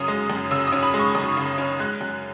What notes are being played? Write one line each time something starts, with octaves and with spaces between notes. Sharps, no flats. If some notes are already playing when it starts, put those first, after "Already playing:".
Already playing: F#2 C#3 C#4 D#6
G#3
F#2
C#3 E6
D#6
C#4
B5
G#3
C#6
F#2 D#6
C#3
C#4
G#3 F#6
F#2